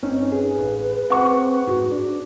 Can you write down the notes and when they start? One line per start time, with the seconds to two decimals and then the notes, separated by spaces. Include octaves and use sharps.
0.03 G1 C4 C#4 D#4
0.32 G#4 B4
0.58 A1
1.10 C4 F#5 C#6
1.67 G#2 F#4
1.91 D4